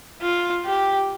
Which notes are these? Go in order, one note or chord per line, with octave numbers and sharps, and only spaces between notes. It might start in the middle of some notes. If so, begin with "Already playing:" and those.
F4
G4